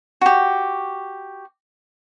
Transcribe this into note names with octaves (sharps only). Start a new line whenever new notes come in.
F#4 G4